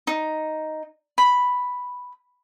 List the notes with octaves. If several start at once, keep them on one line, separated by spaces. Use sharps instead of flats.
D#4
B5